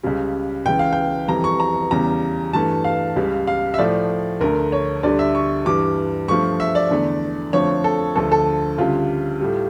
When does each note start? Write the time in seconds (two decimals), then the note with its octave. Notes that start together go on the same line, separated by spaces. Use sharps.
0.03 C#2 C#3 G3
0.66 C#2 C#3 E3 G5
0.79 F5
0.93 G5
1.28 F2 E3 G3 A#5
1.44 C#6
1.60 A#5
1.91 E2 C#3 G3 A#5
2.53 G2 E3 A3 A5
2.84 F5
3.16 C#2 C#3 G3
3.47 F5
3.74 E5
3.78 A2 F3 A3 D5
4.41 D2 D3 A3 A#4
4.72 C#5
5.03 D2 D3 G3 D5
5.19 E5
5.35 C#6
5.66 G2 E3 G3 D6
6.28 G2 F3 A3 C#6
6.60 E5
6.75 D5
6.91 E2 D3 A3
7.53 F2 D3 F3 A3 C#5
7.84 A4
8.16 D2 D3 F3 A3 A4
8.32 A4
8.78 D2 C#3 G3 F4
9.41 A2 G3